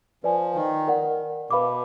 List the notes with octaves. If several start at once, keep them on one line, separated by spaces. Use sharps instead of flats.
F3 B4 D5 G#5
D#3
A#4 D5 F#5
B2 B4 F5 B5 D6